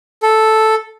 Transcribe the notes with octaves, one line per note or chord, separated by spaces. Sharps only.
A4